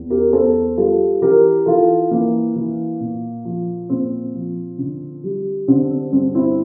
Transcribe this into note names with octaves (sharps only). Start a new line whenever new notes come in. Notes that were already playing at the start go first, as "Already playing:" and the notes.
Already playing: E2
G4 A#4
E2 A4 C5
G3 F4 A4
E3 G4 A#4
E3 F4 A4
E3 A#3
E3
A#2
F3
A#2 C4
F3
D3
G3
D3 C4
C4
G2 C4
C4 E4